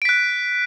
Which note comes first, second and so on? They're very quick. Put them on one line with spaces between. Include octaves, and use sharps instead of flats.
D7 B6 F#6